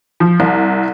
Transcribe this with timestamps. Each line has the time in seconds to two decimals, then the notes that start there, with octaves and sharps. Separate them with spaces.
0.20 F3
0.40 C2